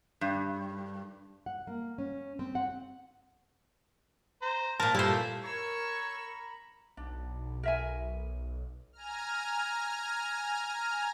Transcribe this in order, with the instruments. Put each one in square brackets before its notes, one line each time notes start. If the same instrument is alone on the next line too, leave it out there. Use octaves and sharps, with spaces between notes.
[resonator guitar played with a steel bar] G2
[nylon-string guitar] F#5
A#3
C#4
C4
F#5
[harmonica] C5 A#5
[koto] A#2 A#4 [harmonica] C5 [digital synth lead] A5
[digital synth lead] G2 [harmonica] F3 A3 A5 [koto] E4 C5
[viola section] A#4 [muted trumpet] C#5 [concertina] A#5 B5 [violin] C#6 E6
[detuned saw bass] B1 [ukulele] D4
[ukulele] A#4 E5 G#5
[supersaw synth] G#5 A#5 F6